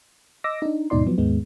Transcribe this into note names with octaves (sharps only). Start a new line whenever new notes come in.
D#5 D6 E6 A#6
D4 D#4
D#2 G#2 B2 D#4 D5 C6
F3 F#3 B3
D#2 G#2 G#3 B3